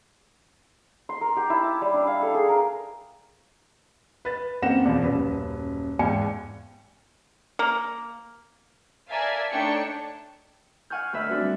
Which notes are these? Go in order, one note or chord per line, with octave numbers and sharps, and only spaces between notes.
C6
A#4
G4
E4
A5
G3
D4
F5
A4
G#4
A#4
B4 A6
F#2 A#3 C4 F#5 A#6 E7
E2 B2 F3
D#1 F#2 B4
E2 G#2 F5 G5 G#5 C#7
A#3
A#4 D5 E5 F5 G#5 A5
A3 D4 D#4 C#5 G5 C#7
F5 F#5 G#5 C#6 F6 G6
D2 B4 E5 B5 F6
C4 D4 F#4 B4
G3